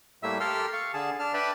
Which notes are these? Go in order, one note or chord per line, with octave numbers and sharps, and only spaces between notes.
A2 G3 A3 A#3 E5 E6
G4 A4 A#4 C6 E6 F6
F5 C#6
D3 G#4 A5
D4 A5 F6
B4 D5 E5 G5 A5 B5